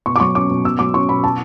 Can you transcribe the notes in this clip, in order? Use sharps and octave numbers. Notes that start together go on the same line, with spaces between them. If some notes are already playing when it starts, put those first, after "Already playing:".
B2 C#6
D6
F#3 C#6
C#4 D6
B2
B2 E6
F#3 D6
C#4 C#6
B2 B5
A5